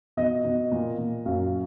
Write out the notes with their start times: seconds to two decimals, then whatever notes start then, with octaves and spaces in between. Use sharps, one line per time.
0.17 B2 D#5
0.44 B2
0.71 A#2
0.98 A#2
1.26 F#2 F5